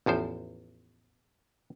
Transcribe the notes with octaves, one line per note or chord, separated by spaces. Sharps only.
A1 E2 F3 C5